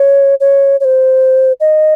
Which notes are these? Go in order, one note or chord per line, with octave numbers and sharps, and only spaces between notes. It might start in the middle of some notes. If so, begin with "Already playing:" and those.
Already playing: C#5
C#5
C#5
C5
D#5